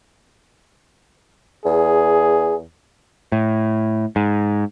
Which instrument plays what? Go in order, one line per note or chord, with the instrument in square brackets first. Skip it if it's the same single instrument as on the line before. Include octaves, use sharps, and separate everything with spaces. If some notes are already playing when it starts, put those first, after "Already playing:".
[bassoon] E2 [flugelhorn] G#4
[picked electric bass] A2
G#2